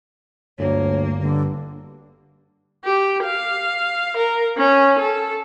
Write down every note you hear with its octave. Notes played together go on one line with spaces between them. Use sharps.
G1 D2 A#3 C#5
G2 D3
G4
F5
A#4
C#4
A4